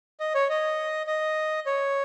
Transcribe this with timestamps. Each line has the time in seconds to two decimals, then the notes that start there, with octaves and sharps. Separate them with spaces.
0.20 D#5
0.35 C#5
0.50 D#5
1.07 D#5
1.66 C#5